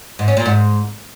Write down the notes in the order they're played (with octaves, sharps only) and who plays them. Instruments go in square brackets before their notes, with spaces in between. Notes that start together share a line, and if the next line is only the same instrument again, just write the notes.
[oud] G#2
C#4
A#2
G#2